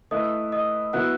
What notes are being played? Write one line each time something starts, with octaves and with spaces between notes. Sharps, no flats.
A3 E4 B4 D#5 D#6
D#5 D#6
F#3 B3 E4 B4 F#5 F#6